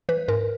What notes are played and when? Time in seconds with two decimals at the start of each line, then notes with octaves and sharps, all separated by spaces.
0.09 E3 B4
0.28 G#2 A#4